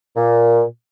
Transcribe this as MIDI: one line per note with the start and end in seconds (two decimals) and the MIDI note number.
0.16 0.62 46